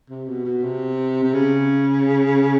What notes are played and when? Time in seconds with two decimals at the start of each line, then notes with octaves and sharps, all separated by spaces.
0.10 C3
0.28 B2
0.45 B2
0.63 C3
1.23 C3
1.34 C#3